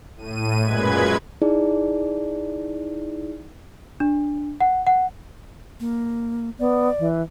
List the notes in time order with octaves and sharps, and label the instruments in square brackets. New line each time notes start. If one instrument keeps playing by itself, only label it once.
[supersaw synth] A2 D#7
F#2 A#2 G#3 B4 G#6
[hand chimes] D#4 E4 G#4 D5
[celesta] D4
F#5
F#5
[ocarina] A#3
[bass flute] B3 [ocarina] D5
[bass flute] E3